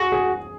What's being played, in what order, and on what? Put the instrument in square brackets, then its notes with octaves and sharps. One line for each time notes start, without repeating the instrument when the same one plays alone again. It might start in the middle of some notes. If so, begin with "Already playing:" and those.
Already playing: [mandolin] F#4 [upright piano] G#4
[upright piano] G#4